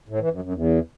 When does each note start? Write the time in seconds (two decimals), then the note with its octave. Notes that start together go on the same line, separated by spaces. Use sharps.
0.08 A2
0.20 E3
0.31 F#2
0.42 F#2
0.53 E2